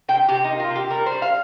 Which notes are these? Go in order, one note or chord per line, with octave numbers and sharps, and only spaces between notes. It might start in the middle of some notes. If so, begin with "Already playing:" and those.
C3 G5
C3 G4
D#4
A#3
F4
C3
G4
G3 A#4
C5
G3
F5